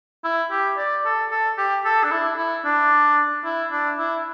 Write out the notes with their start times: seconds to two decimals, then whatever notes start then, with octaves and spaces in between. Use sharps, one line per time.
0.24 E4
0.51 G4
0.77 D5
1.05 A4
1.31 A4
1.58 G4
1.85 A4
2.04 D4
2.11 E4
2.37 E4
2.65 D4
3.45 E4
3.72 D4
3.98 E4